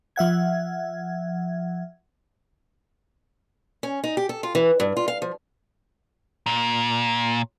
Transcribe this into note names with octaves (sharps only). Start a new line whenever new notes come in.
F3 E5 F#5 G#6
C#4
D#4
G4
A4
F4
E3
G2
F4
F5
F3
A#2